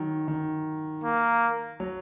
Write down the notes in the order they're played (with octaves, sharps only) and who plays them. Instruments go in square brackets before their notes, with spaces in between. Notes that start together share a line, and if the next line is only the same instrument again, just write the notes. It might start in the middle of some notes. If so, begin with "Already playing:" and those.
Already playing: [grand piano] D#3 F#3
D#3
[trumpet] A#3
[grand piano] F#3